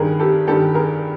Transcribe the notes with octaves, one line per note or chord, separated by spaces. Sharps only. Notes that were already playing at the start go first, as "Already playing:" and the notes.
Already playing: G2 D#3 G#4 A#4
G4 A4
G2 D#3 G4 A4
G#4 A#4